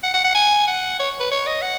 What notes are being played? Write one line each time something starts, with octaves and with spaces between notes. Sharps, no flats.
F#5
F#5
F#5
G#5
F#5
C#5
B4
C#5
D#5
F#5